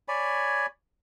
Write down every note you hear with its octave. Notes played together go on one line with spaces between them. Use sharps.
C#5 D5 G#5 B5